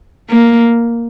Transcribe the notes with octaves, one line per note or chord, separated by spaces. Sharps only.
A#3